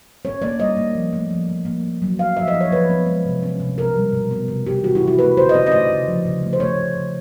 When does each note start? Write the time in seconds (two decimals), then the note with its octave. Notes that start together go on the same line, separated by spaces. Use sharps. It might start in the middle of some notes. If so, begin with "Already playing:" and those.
0.25 C#4 C#5
0.42 A#3 D5
0.59 G3 D#5
0.77 A#3
0.95 F3
1.13 A3
1.31 F3
1.48 F3
1.65 A#3
1.83 A#3
2.02 F#3
2.19 C#4 F5
2.37 F3 E5
2.48 D#5
2.54 F3
2.61 C#5
2.71 F3 B4
2.89 B3
3.07 G#3
3.25 C3
3.43 C#4
3.60 C3
3.78 B2 A#4
3.96 G3
4.13 B2
4.31 B3
4.48 C3
4.66 C3 G4
4.83 E3 F#4
4.95 E4
5.02 C3
5.07 F#4
5.19 A3 B4
5.37 D3 C5
5.49 D#5
5.54 C#4 D5
5.67 D#5
5.72 A3 D5
5.90 C#3
6.08 F3
6.25 C#3
6.43 A3
6.53 C5
6.60 A3 C#5
6.78 F3
6.96 C#3